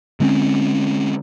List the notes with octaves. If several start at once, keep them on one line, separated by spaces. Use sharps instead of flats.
D3 G#3 C4 C#4